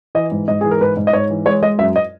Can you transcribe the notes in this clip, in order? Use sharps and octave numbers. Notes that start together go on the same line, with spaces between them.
E3 D#5
G#2
G#2 D#5
E3 G#4
A#4
G#2 B4
G#2
D#5
G#2 C#5
E3
G#3 C#5
G#3 D#5
F#2 E5
D#5